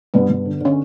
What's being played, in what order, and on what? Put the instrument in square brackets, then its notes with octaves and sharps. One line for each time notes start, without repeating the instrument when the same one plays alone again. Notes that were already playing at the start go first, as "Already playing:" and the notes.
[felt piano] G2 [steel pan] B3
[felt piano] G2
D3
[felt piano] D3 [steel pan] C#4